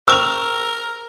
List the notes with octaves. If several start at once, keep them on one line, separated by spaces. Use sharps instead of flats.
A#4 C5 G5 C#6 E6 F6 F7